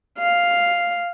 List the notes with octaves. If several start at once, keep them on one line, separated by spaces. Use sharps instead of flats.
F5